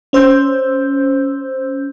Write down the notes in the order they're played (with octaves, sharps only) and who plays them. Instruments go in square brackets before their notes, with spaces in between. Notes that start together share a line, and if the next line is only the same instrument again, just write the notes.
[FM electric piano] C#4 C5 E6 G6